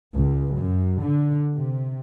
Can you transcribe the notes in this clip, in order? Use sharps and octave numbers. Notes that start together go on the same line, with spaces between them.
C#2
F#2
D3
C3